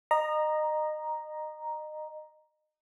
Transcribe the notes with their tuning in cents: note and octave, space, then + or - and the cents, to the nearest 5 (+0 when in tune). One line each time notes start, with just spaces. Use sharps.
D#5 -25 A#5 +5